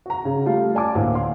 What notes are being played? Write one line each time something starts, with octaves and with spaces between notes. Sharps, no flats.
F#4 A#5
C#3 C#4
G3 A3 F4
D5 G#5 A5 D6
D2 A2 A#3
F5 C6